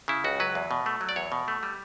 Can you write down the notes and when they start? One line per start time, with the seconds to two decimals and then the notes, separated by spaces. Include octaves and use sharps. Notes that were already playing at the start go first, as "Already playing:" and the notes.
0.08 C#3 E4
0.24 C#2 F#4
0.40 F#3 B4
0.55 E2
0.71 B2
0.86 A3
1.01 F#3
1.09 D5
1.16 E2 C#5
1.32 B2
1.48 A3
1.63 G3